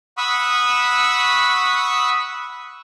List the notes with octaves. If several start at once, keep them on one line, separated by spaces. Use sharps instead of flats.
F#5 B5 C#6 D#6 E6